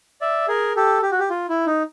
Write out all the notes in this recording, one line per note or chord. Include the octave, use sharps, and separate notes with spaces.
D5 E5
G#4 A#4
G4 A4
G4
F#4
G4
F4
E4
D#4